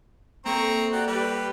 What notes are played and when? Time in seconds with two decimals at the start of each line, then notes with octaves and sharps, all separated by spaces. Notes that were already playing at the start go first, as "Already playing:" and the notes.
0.46 A#3 C4 A4 A#5 C#6
0.92 F#4 G4 D5
1.07 G3 G4 B4